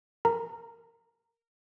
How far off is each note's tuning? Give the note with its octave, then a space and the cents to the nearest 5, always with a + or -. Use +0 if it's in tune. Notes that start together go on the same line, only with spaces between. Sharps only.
A#4 -10 A#5 -10